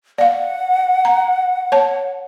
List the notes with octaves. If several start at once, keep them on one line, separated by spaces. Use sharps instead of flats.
D5 F5 F#5
A#5
C#5 A5